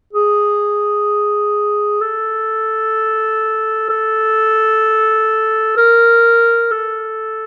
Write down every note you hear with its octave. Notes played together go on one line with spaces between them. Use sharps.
G#4
A4
A4
A#4
A4